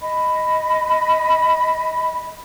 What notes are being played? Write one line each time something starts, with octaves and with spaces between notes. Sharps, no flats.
D#5 B5